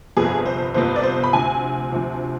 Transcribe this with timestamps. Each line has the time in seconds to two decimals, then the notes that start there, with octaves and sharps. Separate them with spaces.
0.17 G1 F2 C3 F3 B3 G#4
0.46 C5
0.74 G1 F2 C3 F3 B3 C5
0.96 D5
1.03 C5
1.23 B5
1.33 D2 C3 F3 G#5
1.92 D2 C3 F3